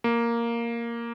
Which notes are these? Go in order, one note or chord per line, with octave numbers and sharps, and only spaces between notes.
A#3